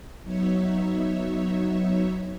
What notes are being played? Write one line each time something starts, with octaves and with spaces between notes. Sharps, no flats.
F#3 B3 D#4 C#5 E5